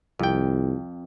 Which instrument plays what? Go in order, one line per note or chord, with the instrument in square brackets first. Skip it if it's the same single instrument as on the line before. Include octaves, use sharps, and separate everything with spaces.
[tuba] C2 [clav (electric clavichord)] F2 G5